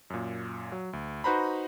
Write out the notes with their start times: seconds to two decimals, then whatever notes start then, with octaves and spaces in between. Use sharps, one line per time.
0.10 F#2 A#2
0.72 F#3
0.93 D2
1.24 D#4 F#4 B4 C5 A#5 B5